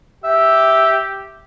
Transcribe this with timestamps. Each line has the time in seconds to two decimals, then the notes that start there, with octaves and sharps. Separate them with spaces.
0.24 G4 E5